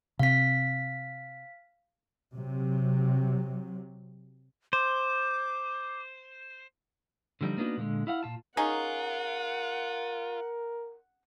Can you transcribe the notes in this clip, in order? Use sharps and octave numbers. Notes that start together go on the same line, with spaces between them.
C3 C4 F5 B6
C3 F#3
C5 D6
D3 F3 G3 C#4 D#4
A#3 B3 D4 D#4 F#4
A#2 D3 E3 G#3
E4 F5 F#5
A#2 F4 A5
C#4 D#4 F4 G#4 A#4 F#5